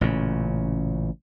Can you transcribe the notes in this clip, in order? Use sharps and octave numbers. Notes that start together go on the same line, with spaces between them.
A1 A#2 C#3